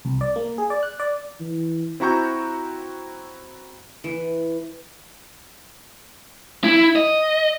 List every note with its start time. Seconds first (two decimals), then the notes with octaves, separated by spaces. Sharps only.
0.05 C2
0.21 D5
0.36 A#3
0.58 G#4
0.70 D5
0.83 F#6
1.00 D5
1.40 E3
2.00 C4 E4 F#4 A#5 C#6 G6
4.04 E3
6.64 E4
6.96 D#5